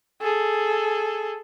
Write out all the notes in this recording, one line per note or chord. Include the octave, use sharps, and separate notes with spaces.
G#4 A4